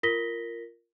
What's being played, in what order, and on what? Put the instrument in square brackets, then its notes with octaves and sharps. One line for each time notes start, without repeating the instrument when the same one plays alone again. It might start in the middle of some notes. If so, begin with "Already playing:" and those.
[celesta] F4 A#4 A#6 B6 G7